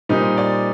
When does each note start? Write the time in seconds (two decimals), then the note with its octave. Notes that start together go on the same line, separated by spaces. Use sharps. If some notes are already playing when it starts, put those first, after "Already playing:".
0.09 A#2 G3 C4 D#4
0.38 D5